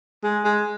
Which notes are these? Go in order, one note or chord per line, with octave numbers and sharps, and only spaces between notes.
G#3
G#3